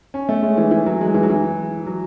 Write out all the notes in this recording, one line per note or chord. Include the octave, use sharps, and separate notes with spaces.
C#4
A3
G#3
E3
E3
F#3
G#3
E3
F#3
E3
F#3